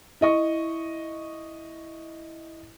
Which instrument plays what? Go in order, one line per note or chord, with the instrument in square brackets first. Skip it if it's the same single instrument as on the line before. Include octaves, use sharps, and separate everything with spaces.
[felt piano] E4 D#5 C#6